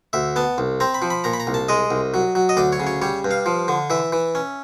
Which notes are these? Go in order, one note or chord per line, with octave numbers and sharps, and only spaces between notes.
D2 E5
B3 A5
C2
C4 A#5
B5
F3
B5
A#2 A#5
B5
A#5
C2
A5
G#3 D#5
C2
F#3
F#3
D#5
D2 D5
C#5
C#3
C#5
G3 C#5
G2
F5
F3
D3
E3 E5
E3
C#4